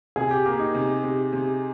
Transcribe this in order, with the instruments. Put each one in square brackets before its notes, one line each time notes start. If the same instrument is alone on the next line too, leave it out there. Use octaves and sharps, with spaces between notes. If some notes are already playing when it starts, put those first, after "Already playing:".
[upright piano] C3 [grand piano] G#4
[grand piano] G4
[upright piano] A#3 [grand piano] G4
[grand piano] D#4
[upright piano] C3
C3
C3